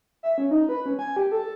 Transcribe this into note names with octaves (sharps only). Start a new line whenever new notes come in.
E5
C#4
D#4
B4
C#4
G#5
G4
A4